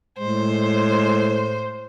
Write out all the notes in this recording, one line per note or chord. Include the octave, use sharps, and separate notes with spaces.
A2 G#3 C5